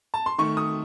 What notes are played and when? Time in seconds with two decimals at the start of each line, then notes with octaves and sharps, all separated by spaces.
0.14 A5
0.26 C6
0.38 D#3 A3 C#6
0.57 D#6